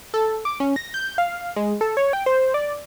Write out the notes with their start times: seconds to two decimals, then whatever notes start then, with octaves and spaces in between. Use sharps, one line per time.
0.14 A4
0.45 D6
0.60 C#4
0.76 A#6
0.94 G6
1.18 F5
1.56 G#3
1.81 A4
1.97 C#5
2.13 G5
2.26 C5
2.54 D5